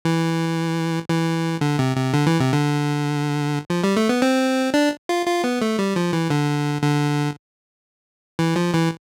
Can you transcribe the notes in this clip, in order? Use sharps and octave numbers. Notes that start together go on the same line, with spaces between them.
E3
E3
D3
C3
C3
D3
E3
C3
D3
F3
G3
A3
B3
C4
D4
F4
F4
B3
A3
G3
F3
E3
D3
D3
E3
F3
E3